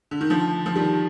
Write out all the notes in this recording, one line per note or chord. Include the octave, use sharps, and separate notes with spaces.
D3
D#3
D3 F3
F3
D#3 G3